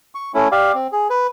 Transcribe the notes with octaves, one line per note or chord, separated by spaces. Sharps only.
C#6
A3 C#4 E4
G4 D5 F5
C4
G#4
B4